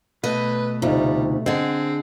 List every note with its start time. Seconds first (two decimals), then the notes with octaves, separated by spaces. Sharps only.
0.24 B2 A3 B4 D#5
0.82 D2 C3 G3 D#4 F4
1.46 D3 C4 G#4 D#5